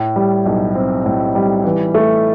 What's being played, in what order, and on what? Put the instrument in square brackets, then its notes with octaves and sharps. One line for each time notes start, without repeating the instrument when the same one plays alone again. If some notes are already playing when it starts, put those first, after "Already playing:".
Already playing: [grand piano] A2
G3
B1
C4
A2
G3
E3
A3